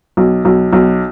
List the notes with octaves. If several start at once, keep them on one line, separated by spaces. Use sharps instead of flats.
B1
B1
B1